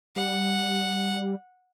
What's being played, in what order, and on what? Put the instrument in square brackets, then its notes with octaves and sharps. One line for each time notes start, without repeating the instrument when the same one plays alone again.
[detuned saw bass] G3 [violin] F#5